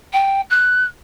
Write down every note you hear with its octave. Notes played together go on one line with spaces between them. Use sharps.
G5
F#6